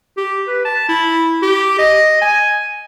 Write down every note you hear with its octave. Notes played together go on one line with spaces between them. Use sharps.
G4
B4
A5
E4
G4
D#5
G#5